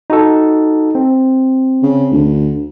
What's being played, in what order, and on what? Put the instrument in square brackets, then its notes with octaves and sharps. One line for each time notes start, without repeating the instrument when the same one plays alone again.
[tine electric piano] D#4 F#4 A4
C4
[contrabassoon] C#3
D2